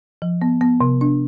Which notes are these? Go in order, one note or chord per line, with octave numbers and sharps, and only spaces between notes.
F3
B3
B3
C3
D4